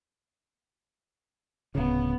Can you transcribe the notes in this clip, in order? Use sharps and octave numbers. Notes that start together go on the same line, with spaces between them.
D1 C#3 B3